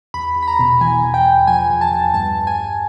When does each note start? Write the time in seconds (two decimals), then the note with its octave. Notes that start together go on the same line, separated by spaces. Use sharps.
0.14 E2 B5
0.36 E2
0.43 B5
0.48 A#5
0.59 B2
0.81 E3 G#5
1.03 E2
1.14 G5
1.26 E2
1.47 F3 G#5
1.70 E2
1.81 A5
1.92 E2
2.14 G2 A5
2.37 G2
2.47 G#5
2.58 G2